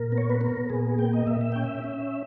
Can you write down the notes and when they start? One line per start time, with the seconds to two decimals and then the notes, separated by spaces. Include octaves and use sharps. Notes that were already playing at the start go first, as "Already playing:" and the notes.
Already playing: A#2 A#4
0.12 B3
0.18 C#5
0.30 B4
0.41 B3 A#4
0.70 A#2 G#4
0.98 A#3 G5
1.13 D#5
1.27 A#2 E5
1.41 E5
1.52 C#4 G5
1.63 E5
1.84 C#4